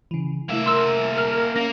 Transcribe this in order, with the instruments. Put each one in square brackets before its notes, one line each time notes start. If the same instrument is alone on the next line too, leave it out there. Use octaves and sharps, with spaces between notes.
[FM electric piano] C#3 E3
[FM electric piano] C3 A3 E4 [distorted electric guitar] A#3 E5
[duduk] A#4 [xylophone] C6 E6 E7
[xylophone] F6 F7
[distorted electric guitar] A#3 [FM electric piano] C#4 C#7 [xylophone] A#6